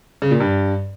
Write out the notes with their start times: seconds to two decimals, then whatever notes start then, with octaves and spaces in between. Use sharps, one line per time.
0.22 C#3
0.31 A#2
0.40 G2